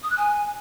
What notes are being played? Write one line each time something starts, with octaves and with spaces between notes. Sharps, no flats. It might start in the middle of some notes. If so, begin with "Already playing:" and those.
D#6
F#6
G#5